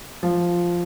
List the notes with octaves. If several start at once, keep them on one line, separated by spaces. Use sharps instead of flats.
F3